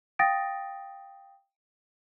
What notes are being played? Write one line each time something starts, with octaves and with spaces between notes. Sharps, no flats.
F5 G5 D#6 A6 A#6 D7